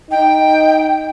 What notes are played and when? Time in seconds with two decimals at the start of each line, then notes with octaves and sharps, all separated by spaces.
0.11 D#4 G5